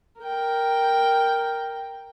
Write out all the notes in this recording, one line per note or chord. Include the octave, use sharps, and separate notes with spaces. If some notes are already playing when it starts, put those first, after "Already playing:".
A#4 G5